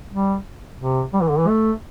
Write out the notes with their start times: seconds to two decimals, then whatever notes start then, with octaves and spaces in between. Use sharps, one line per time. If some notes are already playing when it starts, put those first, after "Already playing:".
0.12 G3
0.79 C3
1.13 G3
1.22 E3
1.30 D3
1.39 E3
1.48 A3